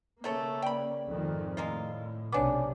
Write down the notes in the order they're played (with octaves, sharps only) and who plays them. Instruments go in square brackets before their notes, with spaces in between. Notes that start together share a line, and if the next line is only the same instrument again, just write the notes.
[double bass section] C#3 A#3 [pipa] A3 A4 C#5
[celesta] D5 [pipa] G5 B5
[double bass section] F2 G#2 D#3
[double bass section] A2 [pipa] G#3 A#3 F4
[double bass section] B1 C3 [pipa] B3 D4 [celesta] C#5 G#5 D6